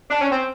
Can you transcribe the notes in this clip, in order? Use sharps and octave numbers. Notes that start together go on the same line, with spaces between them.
D4
C#4
C4